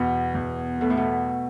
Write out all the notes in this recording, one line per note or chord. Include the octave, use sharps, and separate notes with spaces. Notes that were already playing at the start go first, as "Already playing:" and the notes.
Already playing: E2 B2
E2
B2 A3
A2
B2